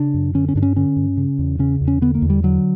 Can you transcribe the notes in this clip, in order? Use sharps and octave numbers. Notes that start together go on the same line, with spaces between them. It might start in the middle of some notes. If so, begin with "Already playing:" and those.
Already playing: C#3 D4
F#2
D3 C#4
C#4
G2 D4
C#4
D3 C#4
G2
C#3
E2
C#3 C#4
E2
C#4
D3 B3
A#3
E2
G3
D3 F#3